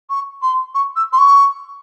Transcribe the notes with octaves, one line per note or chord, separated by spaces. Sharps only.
C#6
C6
C#6
E6
C6
C#6